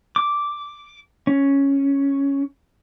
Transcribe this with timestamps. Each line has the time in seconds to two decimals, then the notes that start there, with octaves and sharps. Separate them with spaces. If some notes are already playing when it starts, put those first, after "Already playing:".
0.16 D6
1.27 C#4